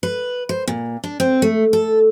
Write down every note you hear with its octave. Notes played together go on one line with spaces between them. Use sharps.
B4
C5
A#2
D4
C4
A3
A4